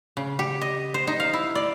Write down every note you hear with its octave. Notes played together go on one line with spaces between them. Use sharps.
C#3
G4
D#5
C5
D#4
F5
E4
D5